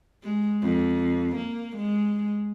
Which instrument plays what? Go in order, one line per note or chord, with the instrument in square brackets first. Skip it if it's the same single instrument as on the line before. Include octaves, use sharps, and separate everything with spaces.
[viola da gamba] G#3
F2
A#3
G#3